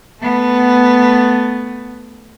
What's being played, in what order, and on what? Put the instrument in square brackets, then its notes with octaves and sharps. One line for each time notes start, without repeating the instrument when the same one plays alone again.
[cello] A3 B3